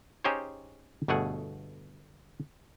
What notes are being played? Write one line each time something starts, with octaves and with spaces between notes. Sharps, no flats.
C#4 D#4 G4 G#4 C5 C#5
G1 B2 A3 G#4 F#5